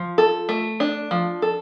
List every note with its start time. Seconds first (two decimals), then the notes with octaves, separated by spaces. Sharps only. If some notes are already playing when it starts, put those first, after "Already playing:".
Already playing: F3
0.18 A4
0.49 A3
0.80 D4
1.11 F3
1.42 A4